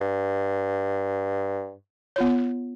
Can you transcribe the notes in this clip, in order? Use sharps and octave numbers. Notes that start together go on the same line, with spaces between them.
G2
B3 F4 C#5